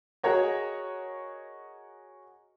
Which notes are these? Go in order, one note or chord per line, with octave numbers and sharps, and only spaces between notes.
F#4 G#4 A#4 C#5 D#5